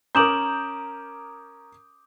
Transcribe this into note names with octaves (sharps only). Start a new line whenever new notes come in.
C#4 A#4 A#5 D6 D#6 G6 E7 F#7